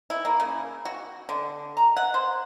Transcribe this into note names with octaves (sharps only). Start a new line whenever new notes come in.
E4
A#3
C#3
F#4
D3
A#5
F#5
C5